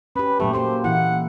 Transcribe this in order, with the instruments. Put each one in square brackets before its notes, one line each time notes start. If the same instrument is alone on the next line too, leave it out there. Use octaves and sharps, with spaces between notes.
[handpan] C#4 G4 [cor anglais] B4
[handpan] A#2 F#3 G4 [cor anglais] A3
[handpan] A#3 G4 A4 [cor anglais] C5
[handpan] A#2 E3 E4 [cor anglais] F#5